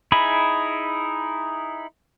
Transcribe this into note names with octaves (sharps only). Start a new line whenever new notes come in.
D#4 E4 G#4 B5